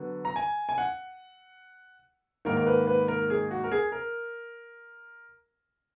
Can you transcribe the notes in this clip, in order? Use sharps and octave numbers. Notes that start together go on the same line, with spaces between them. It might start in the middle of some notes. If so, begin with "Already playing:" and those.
Already playing: D3 F#3 B3
A#5
G#5
G#5
F#5
G#2 D#3 A#3 A#4
A#4
B4
B4
A#4
G#4
F#4
A#4
G#4
A#4